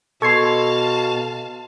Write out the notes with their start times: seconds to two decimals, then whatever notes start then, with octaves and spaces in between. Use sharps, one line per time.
0.22 B2 A4 F5 A5 C6 C#6 G#6 C7